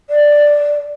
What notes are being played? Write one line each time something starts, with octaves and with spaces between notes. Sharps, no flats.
D5